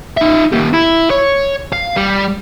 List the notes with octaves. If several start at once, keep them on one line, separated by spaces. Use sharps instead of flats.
D#4 E5
A#2 G4
E4
C#5
F5
G3